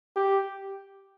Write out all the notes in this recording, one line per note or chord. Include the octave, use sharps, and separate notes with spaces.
G4